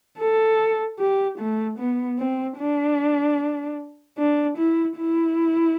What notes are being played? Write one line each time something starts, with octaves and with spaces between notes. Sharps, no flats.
A4
G4
A3
B3
C4
D4
D4
E4
E4